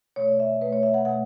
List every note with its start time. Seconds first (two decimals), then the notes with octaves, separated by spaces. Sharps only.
0.16 B2 A3 C#5
0.28 D5
0.40 E5
0.61 B2 A3 B4
0.73 C#5
0.83 E5
0.94 F#5
1.05 B2 A3 F#5